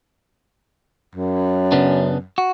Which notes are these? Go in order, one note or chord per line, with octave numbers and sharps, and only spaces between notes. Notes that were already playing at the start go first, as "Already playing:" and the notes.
F#2
C#3 B3 D4
F#4